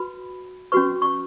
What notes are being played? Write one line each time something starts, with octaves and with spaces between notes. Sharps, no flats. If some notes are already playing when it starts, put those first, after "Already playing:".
Already playing: F#4 B4 B5
C#4 F#4 B4 C#6
C#6